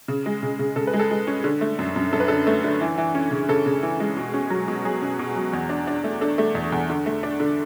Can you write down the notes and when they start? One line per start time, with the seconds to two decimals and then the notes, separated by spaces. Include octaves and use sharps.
0.08 C#3
0.26 G#3
0.43 C#3
0.59 C#3
0.76 C#3 A4
0.87 B4
0.93 G#3
0.99 A4
1.11 G#3
1.27 C#4
1.44 D3
1.61 A3
1.79 F#2
1.96 F#2
2.13 F#2 A4
2.20 B4
2.28 D3 A4
2.47 A3
2.64 D3
2.81 E3
2.98 E3
3.15 C#4
3.31 C#3
3.48 C#3 A4
3.66 C#3
3.83 E3
4.00 G#3
4.17 B2
4.34 C#4
4.50 F#3
4.68 B2
4.85 F#3 G#4
5.02 C#4
5.19 B2
5.36 F#3
5.53 E2
5.69 D4
5.87 D4
6.04 A3
6.21 D4 A4
6.38 A3
6.55 E2
6.72 E2
6.90 D3
7.06 A3
7.23 D4
7.40 D3